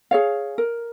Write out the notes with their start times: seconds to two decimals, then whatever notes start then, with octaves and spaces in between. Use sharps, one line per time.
0.11 G#4 C#5 F5
0.58 A#4